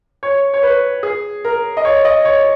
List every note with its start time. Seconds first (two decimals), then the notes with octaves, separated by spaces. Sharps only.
0.23 C#5
0.54 C#5
0.63 B4
1.03 G#4
1.45 A#4
1.77 D#5
1.85 C#5
2.05 D#5
2.25 C#5